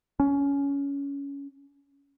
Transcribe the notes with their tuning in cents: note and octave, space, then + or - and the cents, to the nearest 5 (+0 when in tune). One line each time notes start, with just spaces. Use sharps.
C#4 +20